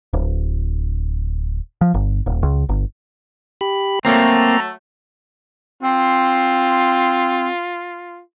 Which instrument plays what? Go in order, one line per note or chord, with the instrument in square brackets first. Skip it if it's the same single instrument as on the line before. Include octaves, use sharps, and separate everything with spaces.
[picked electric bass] D1
F3
G1
D#1
C#2
G1
[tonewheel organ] G4 B5
[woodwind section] F#3 A3 [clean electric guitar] A#3 C4 [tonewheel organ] A#5
[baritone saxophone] C4 [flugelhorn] F4